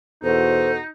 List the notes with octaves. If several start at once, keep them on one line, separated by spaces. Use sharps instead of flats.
E2 B2 D#4 F#4 A4 C5